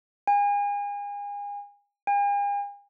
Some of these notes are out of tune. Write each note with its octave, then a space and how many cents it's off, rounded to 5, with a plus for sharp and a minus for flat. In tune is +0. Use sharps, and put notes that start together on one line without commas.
G#5 -35
G#5 -45